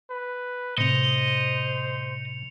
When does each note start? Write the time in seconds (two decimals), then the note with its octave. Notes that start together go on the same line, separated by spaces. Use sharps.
0.10 B4
0.78 A2 C3 C5 D#5 C#7 F7